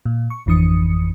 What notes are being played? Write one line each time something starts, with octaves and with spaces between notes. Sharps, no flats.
A#2
C#6
G#1 F2 E3 D4 D#6 C#7